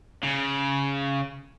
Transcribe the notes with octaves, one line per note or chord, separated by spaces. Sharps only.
C#3